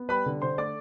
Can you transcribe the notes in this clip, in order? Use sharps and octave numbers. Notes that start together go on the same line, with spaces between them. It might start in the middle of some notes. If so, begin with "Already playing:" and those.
Already playing: B3
G3 B4 B5
D3
D3 C5 C6
A3 D5 D6